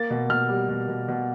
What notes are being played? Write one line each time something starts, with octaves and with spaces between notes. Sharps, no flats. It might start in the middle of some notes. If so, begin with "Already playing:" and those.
Already playing: A#3 A6
B2
B2 F6
G3
B2
B2
B2